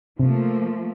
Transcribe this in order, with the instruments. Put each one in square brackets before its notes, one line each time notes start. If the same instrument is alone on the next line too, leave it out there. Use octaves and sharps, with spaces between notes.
[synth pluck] C3 [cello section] F3 A3 A#3